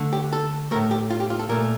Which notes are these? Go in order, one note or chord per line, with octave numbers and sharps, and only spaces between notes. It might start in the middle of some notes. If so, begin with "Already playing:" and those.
Already playing: D3 A3
G4
A4
A2 A3 A#4
G4
F4
G4
F4
A4
A#2 A3 A#4